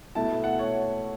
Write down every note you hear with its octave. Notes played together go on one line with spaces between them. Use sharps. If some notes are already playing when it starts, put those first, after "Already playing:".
B2 A3 E4 A5
F#5
C#5